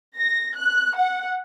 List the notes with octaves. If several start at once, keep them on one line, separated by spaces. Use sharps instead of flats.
A#6
F#6
F#5